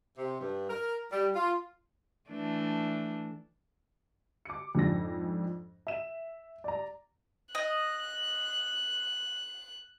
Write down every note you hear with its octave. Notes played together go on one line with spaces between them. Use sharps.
C3
G2
A#4
G3
F4
E3 A3 D4
D6 C#7
F2 G#2 D4 A#6
E5 E7
D5 A#5
D#5 F#6